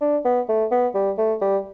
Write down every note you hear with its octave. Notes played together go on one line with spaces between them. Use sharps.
D4
B3
A3
B3
G3
A3
G3